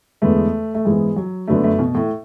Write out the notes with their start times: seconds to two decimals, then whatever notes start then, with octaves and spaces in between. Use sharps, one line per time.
0.22 E2 D3 G#3 A3 B3
0.74 A3
0.85 G#2 E3 G#3 B3 E4
1.16 F#3
1.47 F#2 D3 F#3 A3 B3 D4
1.64 A3
1.79 B2
1.95 A2